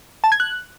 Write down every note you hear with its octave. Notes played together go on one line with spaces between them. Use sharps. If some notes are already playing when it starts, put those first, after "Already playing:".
A5
G#6
F#6